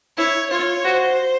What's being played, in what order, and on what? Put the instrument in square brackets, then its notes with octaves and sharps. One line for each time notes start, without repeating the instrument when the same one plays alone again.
[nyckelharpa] E4 [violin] C#5
[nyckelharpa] F4 [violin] C#5
[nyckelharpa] F#4 [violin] C5